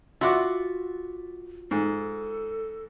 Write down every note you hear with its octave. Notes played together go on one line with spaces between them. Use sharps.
F4 F#4 E5 D6
G#2 A4